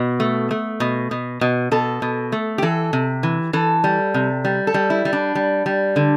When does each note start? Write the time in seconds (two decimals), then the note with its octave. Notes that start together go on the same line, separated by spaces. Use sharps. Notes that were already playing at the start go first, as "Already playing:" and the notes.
Already playing: B2
0.20 A3
0.51 A3
0.80 B2
1.11 B2
1.41 B2
1.71 B2 A4
2.02 B2
2.32 A3
2.58 G4
2.62 E3 A4
2.93 C3
3.23 E3
3.53 E3 A4
3.84 G3
4.14 C3
4.45 G3
4.67 A4
4.74 G3
4.90 E4
5.05 G3
5.13 D4
5.35 G3
5.66 G3
5.96 D3